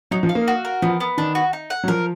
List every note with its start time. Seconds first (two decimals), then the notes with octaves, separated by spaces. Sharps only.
0.11 F#3 D#4
0.23 F3
0.29 F5
0.35 A#3
0.48 F#4
0.65 A#4
0.82 F3 B3
1.00 B3
1.17 D#3 D4
1.35 F#4
1.53 D#4
1.70 F#5
1.84 F#3
1.88 F3 A#4